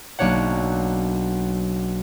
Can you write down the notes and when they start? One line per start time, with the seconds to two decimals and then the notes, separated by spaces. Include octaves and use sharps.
0.19 B1 A#3 D4 C#5 F#5